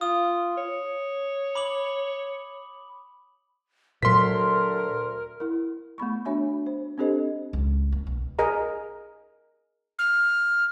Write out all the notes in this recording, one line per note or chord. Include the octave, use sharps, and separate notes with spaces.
F4 D#6
C#5
B5 D6 F#7
D2 A#2 F#3 A#4 C6 B6
E4 A#4
A3 B3 B5 C#6
D4 F#4 C#5 E5 G#5 B5
C5
C4 D4 G4 A4 C5 D#5
C#2
A#3
B1
G#4 A#4 D#5 A#5
F6